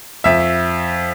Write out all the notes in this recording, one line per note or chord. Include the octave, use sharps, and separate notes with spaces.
F2 E5